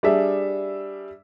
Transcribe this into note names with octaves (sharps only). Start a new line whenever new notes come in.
G3 D4 G#4 E5